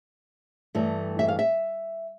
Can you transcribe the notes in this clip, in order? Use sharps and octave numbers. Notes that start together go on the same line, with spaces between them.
G2 E3 A3
E5
F5
E5